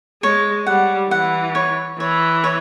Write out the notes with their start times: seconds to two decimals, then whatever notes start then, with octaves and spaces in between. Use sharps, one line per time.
0.23 G#3 C#5
0.66 G3 F#5
1.11 E3 F#5
1.55 C#5
1.99 E3 C#5
2.44 C#5